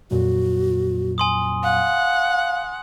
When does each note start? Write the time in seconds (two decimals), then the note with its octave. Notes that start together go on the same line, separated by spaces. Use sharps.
0.11 F2 A#2 F#3 F#4
1.18 G#5 C6 D#6
1.63 F5 F#5